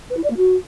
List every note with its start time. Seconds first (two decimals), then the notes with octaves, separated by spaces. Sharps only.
0.10 B4
0.17 E4
0.23 D5
0.30 A#3
0.37 F#4